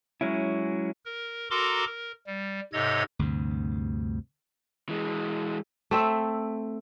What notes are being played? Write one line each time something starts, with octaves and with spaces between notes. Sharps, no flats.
F#3 G#3 C#4 E4
A#4
F#4 A4 A#4 A#5 C6 D6
A#4
G3
G#2 C3 A4 C#5 D#5 G#6
D2 G2 C3
E3 G#3
A3 C4 E5